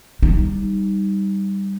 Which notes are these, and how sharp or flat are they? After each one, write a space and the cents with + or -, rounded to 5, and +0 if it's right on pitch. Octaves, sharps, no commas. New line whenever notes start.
G3 +0 D#4 +0